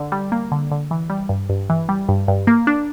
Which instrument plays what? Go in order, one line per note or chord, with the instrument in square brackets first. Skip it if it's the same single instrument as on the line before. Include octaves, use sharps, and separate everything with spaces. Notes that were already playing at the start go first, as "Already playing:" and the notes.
Already playing: [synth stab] D3
G3
A#3
D3
D3
E3
G3
G2
G2
E3
G3
G2
G2
A#3
D4